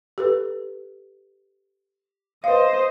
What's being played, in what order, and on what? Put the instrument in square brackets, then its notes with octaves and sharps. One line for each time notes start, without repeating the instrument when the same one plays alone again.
[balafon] G4 A4 B4
[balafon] B4 F5 [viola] C5 D#5